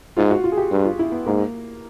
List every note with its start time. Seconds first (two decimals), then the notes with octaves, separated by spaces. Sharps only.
0.17 G#2 F4
0.31 F#4
0.44 F4
0.52 G#4
0.58 G4
0.71 G2
0.85 F4
0.99 E4
1.12 B3
1.26 G#2 A#3